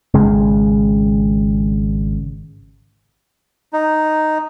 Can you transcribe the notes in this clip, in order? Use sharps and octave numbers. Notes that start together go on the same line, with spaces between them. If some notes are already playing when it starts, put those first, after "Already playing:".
G#1 C#3 G#3
D#4